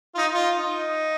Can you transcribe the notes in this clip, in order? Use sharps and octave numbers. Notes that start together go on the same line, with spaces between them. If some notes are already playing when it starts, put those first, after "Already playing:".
F4
D#4
F4
D#4